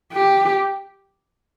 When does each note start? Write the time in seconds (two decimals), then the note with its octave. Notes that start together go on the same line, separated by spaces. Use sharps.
0.13 G4